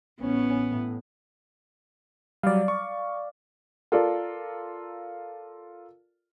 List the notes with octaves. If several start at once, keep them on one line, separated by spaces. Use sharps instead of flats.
A1 B3 C#4
A2
F#3 G3 D5 F5
C#6
F4 A4 A#4 D5